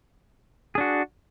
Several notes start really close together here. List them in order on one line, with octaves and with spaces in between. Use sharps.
G#4 D4 F#4